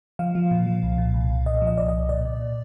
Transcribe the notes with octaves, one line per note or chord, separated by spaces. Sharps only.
F3 F5
F3
A#2
F3
C2
A#2
C2
C2
A#2 D#5
F3
D#5
C2 D5
C2 D#5
A#2 D5
A#2